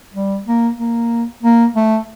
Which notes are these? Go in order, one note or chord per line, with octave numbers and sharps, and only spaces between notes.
G3
A#3
A#3
A#3
A3